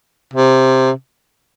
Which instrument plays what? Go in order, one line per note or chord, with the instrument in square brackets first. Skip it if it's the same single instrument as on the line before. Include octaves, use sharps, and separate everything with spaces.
[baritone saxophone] C3